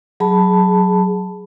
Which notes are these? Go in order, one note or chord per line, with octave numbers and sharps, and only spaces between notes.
F#3 G#4 A5 B5